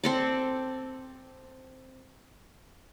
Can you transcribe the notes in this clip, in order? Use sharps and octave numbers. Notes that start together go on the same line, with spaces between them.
C4 A4 D5